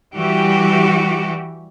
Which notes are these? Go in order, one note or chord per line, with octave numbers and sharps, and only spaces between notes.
E3 G3 F#4 G4